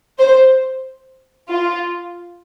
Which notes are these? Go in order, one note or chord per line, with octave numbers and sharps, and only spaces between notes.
C5
F4